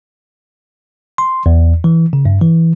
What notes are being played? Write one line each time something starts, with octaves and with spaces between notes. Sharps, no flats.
C6
E2
E3
C#3
G2
E3